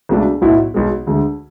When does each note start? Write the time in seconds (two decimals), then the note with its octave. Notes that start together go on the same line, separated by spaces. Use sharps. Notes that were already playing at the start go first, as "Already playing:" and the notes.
0.09 C#2 B2 A3 D4
0.41 B1 A2 F#3 B3 E4
0.74 B1 B2 G#3
1.07 D2 D3 G#3